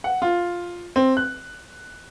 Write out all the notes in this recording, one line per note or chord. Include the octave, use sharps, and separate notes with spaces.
F#5
F4
C4
F#6